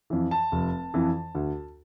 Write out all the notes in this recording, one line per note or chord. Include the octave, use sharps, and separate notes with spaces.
F2 E3
A5
F1
F2 E3
D2